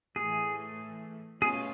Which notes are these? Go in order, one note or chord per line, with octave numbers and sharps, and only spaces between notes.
A2 E3 A3 G#4
B2 F#3 A3 C#4 F4 G#4